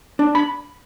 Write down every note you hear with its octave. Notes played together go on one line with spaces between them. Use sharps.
D4
B5